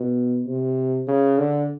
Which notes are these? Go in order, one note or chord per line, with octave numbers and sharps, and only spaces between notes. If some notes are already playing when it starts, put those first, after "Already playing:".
Already playing: B2
C3
C#3
D3